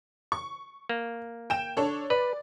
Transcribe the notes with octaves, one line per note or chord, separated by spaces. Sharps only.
C#6
A#3
G5 E7
D4 A4 C#5
B4 D5